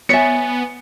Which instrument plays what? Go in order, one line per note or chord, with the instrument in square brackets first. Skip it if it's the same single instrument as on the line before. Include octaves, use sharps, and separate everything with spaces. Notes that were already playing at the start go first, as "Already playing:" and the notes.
[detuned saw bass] B3 [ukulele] C#5 E5 [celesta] G#5 A6 B6 [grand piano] C#7